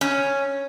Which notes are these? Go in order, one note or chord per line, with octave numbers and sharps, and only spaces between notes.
C#4